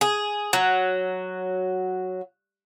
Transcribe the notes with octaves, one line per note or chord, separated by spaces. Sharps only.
G#4
F#3